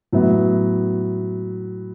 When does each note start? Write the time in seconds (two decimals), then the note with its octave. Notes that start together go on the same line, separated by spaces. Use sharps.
0.13 A2 F#3 B3 E4